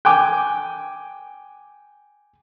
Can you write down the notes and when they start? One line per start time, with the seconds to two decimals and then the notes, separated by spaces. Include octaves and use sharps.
0.05 G5 G#5 D6